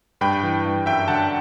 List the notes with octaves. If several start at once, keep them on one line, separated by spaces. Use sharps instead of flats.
G2 G5 B5
E3
G2
F#2 E5 G5
D3 F#5 A5